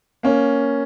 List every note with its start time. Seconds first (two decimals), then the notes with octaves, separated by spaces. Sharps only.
0.23 A#3 C#4